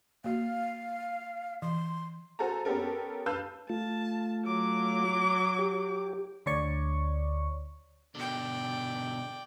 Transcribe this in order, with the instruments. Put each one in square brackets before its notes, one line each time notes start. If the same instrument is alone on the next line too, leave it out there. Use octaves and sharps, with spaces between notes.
[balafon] A#3 F#4 [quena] F5
[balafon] E3 [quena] C6
[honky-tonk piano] F#4 A4 C5 G#5 A#5
B3 C#4 G4 A4 A#4
B4 F5 A5 E6 F#6 G6
[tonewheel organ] A3 F4 [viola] A5
[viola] F#3 D6
[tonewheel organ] G4
[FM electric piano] D2 D3 C#5 D5 C#6
[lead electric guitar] B2 D3 [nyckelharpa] D5 G5